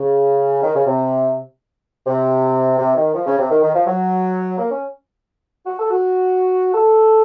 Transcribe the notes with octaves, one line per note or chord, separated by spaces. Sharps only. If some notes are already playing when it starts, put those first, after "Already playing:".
Already playing: C#3
D#3
C#3
C3
C3
C3
D#3
F3
C#3
C3
D#3
D#3
F3
F#3
A#3
C#4
F#4
A4
F#4
A4